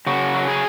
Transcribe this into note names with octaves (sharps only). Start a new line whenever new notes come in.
C#3 F#4
F#3
G#4